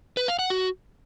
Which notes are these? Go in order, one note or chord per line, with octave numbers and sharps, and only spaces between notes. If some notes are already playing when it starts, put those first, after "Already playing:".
B4
F5
F#5
F#4